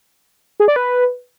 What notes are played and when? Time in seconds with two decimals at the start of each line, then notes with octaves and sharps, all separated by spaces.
0.60 G#4
0.68 D5
0.76 B4